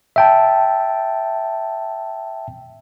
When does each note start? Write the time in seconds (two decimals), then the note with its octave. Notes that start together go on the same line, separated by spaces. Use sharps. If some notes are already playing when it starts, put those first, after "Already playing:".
0.16 E5 G5 A5